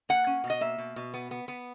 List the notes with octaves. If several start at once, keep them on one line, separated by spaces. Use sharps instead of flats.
A#3 F#5
C#4
B2
D#5
A#3 E5
B2
B2
B3
B3
B3